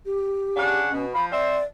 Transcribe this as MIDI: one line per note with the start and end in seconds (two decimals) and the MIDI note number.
0.06 0.81 67
0.56 0.91 49
0.56 0.91 62
0.56 0.91 78
0.91 1.08 47
0.91 1.06 61
1.13 1.29 53
1.13 1.25 83
1.31 1.58 60
1.31 1.58 72
1.31 1.64 74
1.31 1.58 76